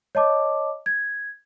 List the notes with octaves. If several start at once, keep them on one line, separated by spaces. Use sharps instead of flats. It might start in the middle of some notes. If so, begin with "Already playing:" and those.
C#5 D#5 A5 D6
G#6